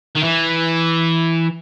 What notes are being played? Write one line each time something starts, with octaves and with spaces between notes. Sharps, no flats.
D#3
E3